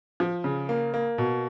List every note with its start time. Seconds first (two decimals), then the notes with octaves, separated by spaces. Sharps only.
0.20 F3
0.44 C#3
0.69 A#3
0.94 A#3
1.18 B2